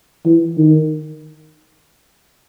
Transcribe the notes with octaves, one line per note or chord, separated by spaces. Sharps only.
E3
D#3